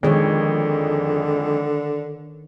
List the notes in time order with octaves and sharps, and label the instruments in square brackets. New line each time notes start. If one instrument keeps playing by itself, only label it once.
[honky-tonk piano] F2 G#3 [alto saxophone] D3 [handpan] D#3 C#5